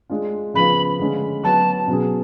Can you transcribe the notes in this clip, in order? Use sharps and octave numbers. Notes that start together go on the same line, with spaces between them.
G#3 D4 F4
C#3 F3 B3 F4 B5
D3 G#3 C#4
F#3 B3 F#4 A5
B2 F#3 C#4 G#4